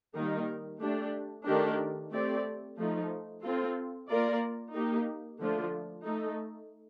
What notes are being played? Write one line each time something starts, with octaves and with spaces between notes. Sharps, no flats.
D#3 G3 A#3 D#4 A#4
A3 D4 G4
D#3 A3 D4 G4 A#4
A3 C4 G4 D5
F3 A3 D#4
C4 F4 A4
A#3 F4 A#4 D5
A#3 D#4 G4
D3 F3 A3 D4 F4
A3 D#4 A4